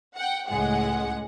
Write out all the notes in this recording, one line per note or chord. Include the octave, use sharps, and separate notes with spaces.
F#5 G5
C#2 A2 G#3 F#5